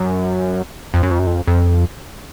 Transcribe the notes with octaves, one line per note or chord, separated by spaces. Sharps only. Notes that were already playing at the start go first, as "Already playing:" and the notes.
Already playing: F#2
F2
F#2
F2
F#2
F2
F2